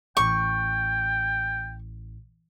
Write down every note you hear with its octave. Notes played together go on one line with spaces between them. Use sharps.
A1 G5 C#6